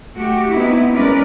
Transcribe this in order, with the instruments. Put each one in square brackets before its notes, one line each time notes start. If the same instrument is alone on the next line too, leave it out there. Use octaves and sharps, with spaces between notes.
[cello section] A3 F#4 G4
B3 C4 D#4 E4
G#3 A#3 C#4 A#4 B4 D5